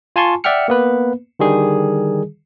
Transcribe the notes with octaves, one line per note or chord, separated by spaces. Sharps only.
F4 G#5 A5 C6 C#6
D5 E5 F#5 G5 F6 C#7
A#3 B3 B4
D3 D#3 G3 G#4